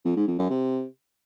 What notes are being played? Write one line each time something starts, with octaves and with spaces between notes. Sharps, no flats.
F2
G#2
F2
F#2
C3